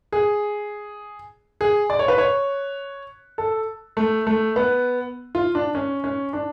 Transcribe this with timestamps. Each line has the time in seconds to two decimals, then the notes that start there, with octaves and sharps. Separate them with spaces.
0.12 G#4
1.61 G#4
1.90 D5
1.99 C#5
2.08 B4
2.18 C#5
3.38 A4
3.97 A3
4.27 A3
4.56 B3
5.35 F4
5.55 D4
5.75 C#4
6.04 C#4
6.33 D4